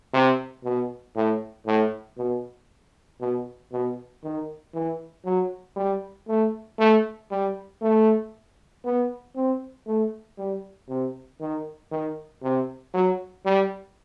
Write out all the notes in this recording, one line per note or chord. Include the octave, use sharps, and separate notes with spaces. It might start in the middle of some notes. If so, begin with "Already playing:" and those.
C3
B2
A2
A2
B2
B2
B2
D#3
E3
F#3
G3
A3
A3
G3
A3
B3
C4
A3
G3
C3
D#3
D#3
C3
F#3
G3